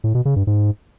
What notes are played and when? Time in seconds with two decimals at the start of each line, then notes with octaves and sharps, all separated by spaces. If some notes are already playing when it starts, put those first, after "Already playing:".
0.04 A2
0.15 B2
0.25 C#3
0.36 G2
0.47 G#2